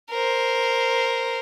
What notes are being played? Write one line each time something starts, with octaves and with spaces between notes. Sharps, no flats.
A#4 C5